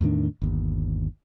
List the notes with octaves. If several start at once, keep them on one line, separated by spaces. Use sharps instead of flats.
E2 A2 D#3 D4
G1 D#2